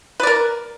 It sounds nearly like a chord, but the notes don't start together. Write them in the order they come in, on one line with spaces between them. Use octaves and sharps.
B4 D5 A#4